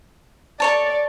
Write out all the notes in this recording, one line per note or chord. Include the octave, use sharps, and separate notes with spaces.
A4 C#5 D5 A5